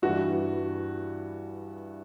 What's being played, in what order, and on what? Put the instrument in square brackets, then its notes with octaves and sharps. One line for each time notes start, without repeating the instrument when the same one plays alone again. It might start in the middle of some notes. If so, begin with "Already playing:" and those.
[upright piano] G2 E3 G3 F#4